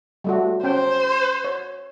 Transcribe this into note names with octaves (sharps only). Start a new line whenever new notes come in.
G3 A3 F#4
C#4 C5 G5
C#5